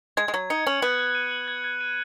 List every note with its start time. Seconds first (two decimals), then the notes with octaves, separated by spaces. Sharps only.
0.17 G#3 G#6
0.28 G#3
0.34 F#3 G#6
0.50 D#4 C#7
0.66 C#4 F#7
0.82 B3 F#6
0.99 F#6
1.15 D#7
1.31 F#7
1.48 G#6
1.64 G#6
1.81 D#7